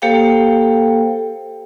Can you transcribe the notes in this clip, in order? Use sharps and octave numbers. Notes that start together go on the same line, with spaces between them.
A#3 G4 A4 C5 F5 G5